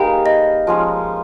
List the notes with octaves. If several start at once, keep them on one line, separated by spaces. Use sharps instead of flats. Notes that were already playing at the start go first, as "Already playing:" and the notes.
Already playing: A#3 D#4 G4 G#4 B4 G5
D#5
F3 G#3 C#4